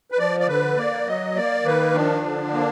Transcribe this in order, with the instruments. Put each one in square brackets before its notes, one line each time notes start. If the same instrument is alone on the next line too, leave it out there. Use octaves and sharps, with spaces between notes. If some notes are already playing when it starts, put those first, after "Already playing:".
[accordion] B4
F3 D5
D5
D3 B4
A#3 D5
F#3 D#5
A#3 D5
D#3 B4
F3 D4
D3
A#3